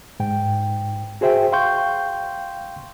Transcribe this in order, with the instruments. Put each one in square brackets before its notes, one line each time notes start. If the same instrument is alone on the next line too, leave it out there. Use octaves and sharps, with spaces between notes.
[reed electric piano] G#2 G5
F#4 G#4 C5 E5 G5
F5 G5 C6 C#6 G6